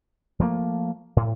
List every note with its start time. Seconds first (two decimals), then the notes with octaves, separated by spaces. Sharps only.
0.39 F3 G3 A3 A#3
1.16 A2